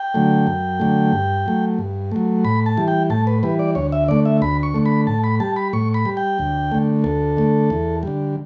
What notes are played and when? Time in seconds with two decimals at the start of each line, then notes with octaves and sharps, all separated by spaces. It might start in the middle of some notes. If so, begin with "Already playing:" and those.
Already playing: G5
0.14 D3 F#3 A3
0.47 F#2
0.80 D3 F#3 A3
1.13 G2
1.46 F#3 A3
1.79 G2
2.12 F#3 A3
2.44 A2 B5
2.66 A5
2.77 E3 G3
2.88 G5
3.10 A2 A5
3.27 B4
3.43 E3 G3 B4
3.59 D5
3.75 D2 C#5
3.92 E5
4.08 D3 A3 D5
4.25 E5
4.42 D2 B5
4.63 C#6
4.74 D3 A3
4.86 B5
5.07 A2 A5
5.24 B5
5.40 G3 A5
5.56 B5
5.73 A2 C#6
5.94 B5
6.05 G3
6.17 G5
6.39 D2
6.71 D3 A3
7.04 D2 A4
7.37 D3 A3
7.70 E2
8.03 D3 G3